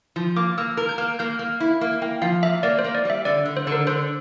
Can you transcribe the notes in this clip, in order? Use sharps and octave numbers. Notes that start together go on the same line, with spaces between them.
F3
A#3 D6
A#3 E6
A#4 F6
G6
A#3 F6
A#3 G6
A#3 F6
E4
A#3
A#3 G5
F3 F5
A#3 E5
A#3 D5
C5
A#3
D5
G3 E5
D3 D5
D3
C5
D3
A#4
D3 C5